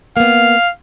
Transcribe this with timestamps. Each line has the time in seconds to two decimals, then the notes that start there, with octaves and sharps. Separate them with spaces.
0.17 A#3 B3 F5